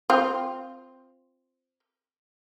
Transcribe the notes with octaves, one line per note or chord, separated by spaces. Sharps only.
C4 F4